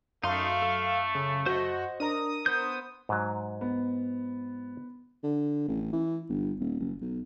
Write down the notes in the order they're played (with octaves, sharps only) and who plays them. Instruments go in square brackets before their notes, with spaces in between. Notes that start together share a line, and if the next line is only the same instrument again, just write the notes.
[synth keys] F#2 [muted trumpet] A3 [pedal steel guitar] D#4 C6 [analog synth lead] F5
[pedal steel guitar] A4
[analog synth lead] C#3
[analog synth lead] F#4 [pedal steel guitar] C5 D#5
[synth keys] D4 A#4 A#5 [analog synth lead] D#6
[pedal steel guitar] B3 C5 G6
[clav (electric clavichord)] G#2 F#3
[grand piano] B3
[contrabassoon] D3
A1
E3
G1
D#1
F#1
B1